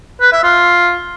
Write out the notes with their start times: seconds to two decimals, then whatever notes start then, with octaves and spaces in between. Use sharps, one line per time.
0.21 B4
0.33 E5
0.44 F4